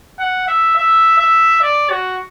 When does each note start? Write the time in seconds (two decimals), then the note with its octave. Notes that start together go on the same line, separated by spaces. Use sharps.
0.19 F#5
0.48 E5
0.77 E5
1.19 E5
1.62 D5
1.90 F#4